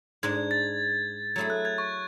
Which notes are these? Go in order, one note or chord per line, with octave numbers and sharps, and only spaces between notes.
G#2 G#3 D4 G#6
A6
F#3 A3 E4 G#4 G#6
F#6
G#6
C#6